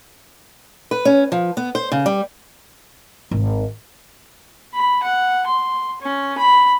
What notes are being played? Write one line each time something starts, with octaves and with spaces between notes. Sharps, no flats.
B4
C#4
F3
B3
C5
C#3
G3
G#1
B5
F#5
C6
C#4
B5